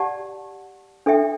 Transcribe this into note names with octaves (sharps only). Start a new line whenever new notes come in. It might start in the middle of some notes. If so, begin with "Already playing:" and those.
Already playing: G4 D5 F#5 A5
D4 A4 E5 G5